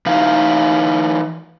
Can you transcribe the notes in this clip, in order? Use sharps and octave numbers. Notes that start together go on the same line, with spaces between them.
E3 D#4 E4 F5